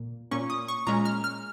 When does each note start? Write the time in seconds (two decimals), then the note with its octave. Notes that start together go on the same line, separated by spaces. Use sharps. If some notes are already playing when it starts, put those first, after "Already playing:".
Already playing: A#2 A#3
0.31 A#2 A#3 C#4 C#6
0.50 D#6
0.68 C#6
0.87 A#2 G#3 C#4 A#5
1.05 F6
1.24 F6